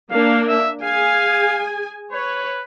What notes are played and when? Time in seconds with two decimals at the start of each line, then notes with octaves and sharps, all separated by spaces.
0.11 A#3 D4 F5
0.48 E5
0.83 G#4 F5 G#5
2.12 B4 C#5